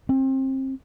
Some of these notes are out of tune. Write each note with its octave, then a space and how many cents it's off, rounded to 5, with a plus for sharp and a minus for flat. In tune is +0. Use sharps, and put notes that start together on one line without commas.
C4 +30